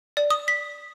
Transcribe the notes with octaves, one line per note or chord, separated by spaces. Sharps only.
D5
D#6
B6